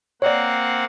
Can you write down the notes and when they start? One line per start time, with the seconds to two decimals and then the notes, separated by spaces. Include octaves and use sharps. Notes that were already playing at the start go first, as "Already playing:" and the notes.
0.22 A#3 C4 C#5 D5 F#5